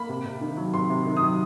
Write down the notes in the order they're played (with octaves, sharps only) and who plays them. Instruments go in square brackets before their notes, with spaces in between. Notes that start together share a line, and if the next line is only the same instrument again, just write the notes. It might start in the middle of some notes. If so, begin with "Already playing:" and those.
Already playing: [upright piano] A#3 B5
C3
C3
D#3
F#3
C3 C6
C3
D#3
D#6
F#3